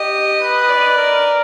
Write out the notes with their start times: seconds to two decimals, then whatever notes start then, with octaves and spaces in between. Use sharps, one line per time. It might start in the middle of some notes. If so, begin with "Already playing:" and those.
Already playing: G4 D#5
0.41 B4
0.69 D5
0.98 A#4